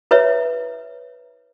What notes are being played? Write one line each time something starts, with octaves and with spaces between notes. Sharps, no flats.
E4 B4 C#5 E5